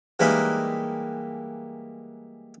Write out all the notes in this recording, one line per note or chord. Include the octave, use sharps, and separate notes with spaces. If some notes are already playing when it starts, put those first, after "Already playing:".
E3 G3 G#3 A#3 D#4 B4